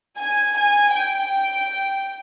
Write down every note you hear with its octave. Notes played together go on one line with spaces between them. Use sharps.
G#5
G#5
G5